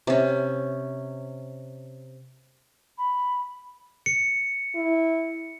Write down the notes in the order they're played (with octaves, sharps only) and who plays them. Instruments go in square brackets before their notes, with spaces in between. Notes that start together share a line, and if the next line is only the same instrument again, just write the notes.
[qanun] C3 C#4
[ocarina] B5
[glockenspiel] C#7
[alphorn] E4